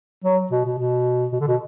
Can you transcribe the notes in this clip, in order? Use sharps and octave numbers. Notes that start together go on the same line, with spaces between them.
F#3
B2
B2
B2
B2
D3
B2